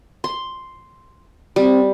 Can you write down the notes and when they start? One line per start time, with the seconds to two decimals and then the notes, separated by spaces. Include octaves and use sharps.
0.24 C6
1.56 G3 C4